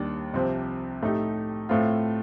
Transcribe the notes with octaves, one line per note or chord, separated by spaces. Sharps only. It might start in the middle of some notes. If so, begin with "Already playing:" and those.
Already playing: D#2 D#3 G3 D4
C2 C3 F3 C4
A2 A3 D#4 G4
A2 A3 C4 F4